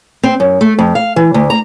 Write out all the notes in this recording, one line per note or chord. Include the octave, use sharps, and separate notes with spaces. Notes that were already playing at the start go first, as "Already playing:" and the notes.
C4
F#2
A3
F2
F5
E3
D2
A#5